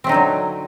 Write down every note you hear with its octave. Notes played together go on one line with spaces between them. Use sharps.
D3 F#3 A3 C4 D#4